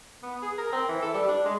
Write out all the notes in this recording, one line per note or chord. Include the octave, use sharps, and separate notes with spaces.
B3
G#4
A#4
C4
E3
A4
G3
D4
G#3